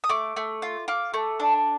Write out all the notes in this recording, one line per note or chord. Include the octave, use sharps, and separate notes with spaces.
D#6
A3 D6
A3
F4
F4 D6
A3
D4